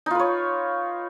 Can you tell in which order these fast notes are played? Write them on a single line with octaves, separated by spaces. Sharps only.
D#4 F4 B4 C#5